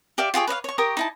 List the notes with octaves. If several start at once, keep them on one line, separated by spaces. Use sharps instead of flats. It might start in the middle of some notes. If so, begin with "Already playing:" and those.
G4 D5 E5 F5
F4 G4 G#4 C#5
B4 C#5 D#5 F5
C#5 C#6
G4 A#4 C#6 D#6
D#4 E4 A5